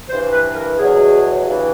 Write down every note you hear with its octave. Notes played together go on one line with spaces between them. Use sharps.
G2 E3 C5
B4
A#4
E2 B2 F#3 G#4
G2 E3